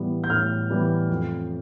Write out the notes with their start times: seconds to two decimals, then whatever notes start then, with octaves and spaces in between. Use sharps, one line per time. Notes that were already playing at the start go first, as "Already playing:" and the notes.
Already playing: A2 E3 G3 B3
0.24 G6
0.30 A2 F6
0.70 E3 G3 B3
1.10 F2